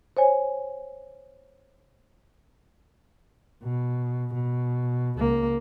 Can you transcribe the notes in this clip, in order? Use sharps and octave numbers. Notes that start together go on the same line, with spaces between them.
C5 C#5 G#5
B2
B2
C#2 A#3